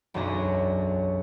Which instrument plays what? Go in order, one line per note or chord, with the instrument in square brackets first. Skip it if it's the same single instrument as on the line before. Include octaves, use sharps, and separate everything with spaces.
[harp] E1 B1 F#2 C#4 D4 A#6